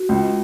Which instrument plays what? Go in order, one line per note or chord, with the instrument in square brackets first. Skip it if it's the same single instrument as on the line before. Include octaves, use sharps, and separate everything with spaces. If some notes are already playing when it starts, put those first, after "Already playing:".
Already playing: [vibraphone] F#4
[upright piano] C#2